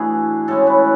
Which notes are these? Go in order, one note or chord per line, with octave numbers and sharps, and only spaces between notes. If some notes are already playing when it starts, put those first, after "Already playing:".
Already playing: A2 E3 D4 E4 F#4 G#4
A2 G#3 C#4 A4
B4